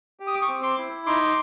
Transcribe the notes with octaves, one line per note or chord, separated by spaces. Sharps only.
G4
D#6
D6
C#6 D#6
C4
C6 D6
E4
D#4 C6 D6